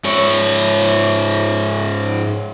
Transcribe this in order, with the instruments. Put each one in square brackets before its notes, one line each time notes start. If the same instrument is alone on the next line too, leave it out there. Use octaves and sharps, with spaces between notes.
[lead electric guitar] G#2 C#5